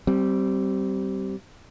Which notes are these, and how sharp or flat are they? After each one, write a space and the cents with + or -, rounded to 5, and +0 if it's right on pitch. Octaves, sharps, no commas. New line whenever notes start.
G3 -20 C4 +0